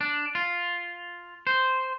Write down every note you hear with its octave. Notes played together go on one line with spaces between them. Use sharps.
D4
F4
C5